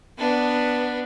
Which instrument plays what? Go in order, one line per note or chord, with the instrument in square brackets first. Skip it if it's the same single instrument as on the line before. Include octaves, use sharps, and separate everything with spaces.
[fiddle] B3 D4